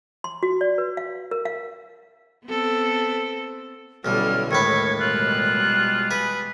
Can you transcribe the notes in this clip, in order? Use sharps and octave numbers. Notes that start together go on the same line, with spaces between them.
C6
F#4
D5
B4
F5
A#4
F5
B3 C4 A4
B1 D3 G3 C#4 E4 F6
D#2 A2 D3 G#3 B4 C#6 G#6
B2 G3 G#3 F4 F#6
G#4 B4